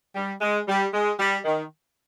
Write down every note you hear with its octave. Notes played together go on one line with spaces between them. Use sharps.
G3
G#3
G3
G#3
G3
D#3